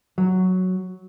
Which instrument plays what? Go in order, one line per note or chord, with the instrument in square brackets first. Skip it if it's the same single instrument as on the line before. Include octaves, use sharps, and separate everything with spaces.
[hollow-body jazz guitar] F#3